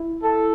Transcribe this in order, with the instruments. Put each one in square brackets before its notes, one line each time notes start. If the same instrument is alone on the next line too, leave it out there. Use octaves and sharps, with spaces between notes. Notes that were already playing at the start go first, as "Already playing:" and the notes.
Already playing: [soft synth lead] E4
[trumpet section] A4